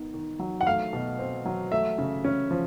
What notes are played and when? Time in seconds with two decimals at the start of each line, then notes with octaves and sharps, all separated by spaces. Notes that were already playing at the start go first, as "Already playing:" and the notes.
Already playing: D#3 B3
0.14 D#3
0.40 F#3
0.61 F#5
0.66 A3 F5
0.93 B2
1.19 C4
1.46 F#3
1.72 A3 E5
1.98 C#3
2.24 C#4
2.51 F3